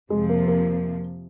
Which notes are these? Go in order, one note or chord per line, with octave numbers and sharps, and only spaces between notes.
F2 C3 F3 G#3
A#3
A#3